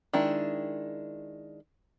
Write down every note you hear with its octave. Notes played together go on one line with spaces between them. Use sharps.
D#3 G#3 D4 E4